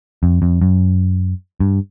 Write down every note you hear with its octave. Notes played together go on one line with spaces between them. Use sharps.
F2
F2
F#2
G2